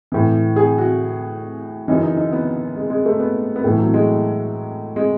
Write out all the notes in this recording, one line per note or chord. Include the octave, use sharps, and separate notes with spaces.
A2 E3
G#4
F#4
F#2 C#3 E3 D#4
D#4
D#4
B3
G#3
G#3
A3
B3
B3
A2 E3 A3
F#3
G#3
G#3